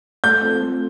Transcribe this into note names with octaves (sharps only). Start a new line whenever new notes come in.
A3 G6
C4 F4 A4 C5
A3